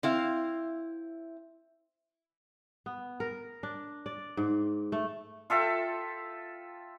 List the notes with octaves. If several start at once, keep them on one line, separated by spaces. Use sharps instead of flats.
C4 E4 F5
B3
A#4
D4
D5
G#2
A3
F4 A4 E5 G5